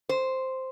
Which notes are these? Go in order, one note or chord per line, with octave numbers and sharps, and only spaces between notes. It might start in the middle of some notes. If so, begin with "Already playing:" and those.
C5